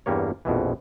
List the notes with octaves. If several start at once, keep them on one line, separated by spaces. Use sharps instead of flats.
E2 G2 G3 A#3 C#5
A#1 F2 B2 E3